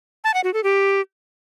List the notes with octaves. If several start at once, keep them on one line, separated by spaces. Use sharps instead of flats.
A5
F#5
F#4
A4
G4